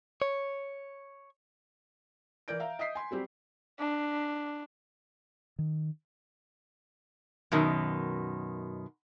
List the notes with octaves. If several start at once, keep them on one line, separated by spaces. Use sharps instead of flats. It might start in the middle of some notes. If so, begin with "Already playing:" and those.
C#5
E3 A#4 D5 G6 D7
E5 F5 A#5
D#5 E5 D#6 B6 C7
G#5 C6
F#3 G3 C4 G4
D4
D#3
F#2 B2 D#3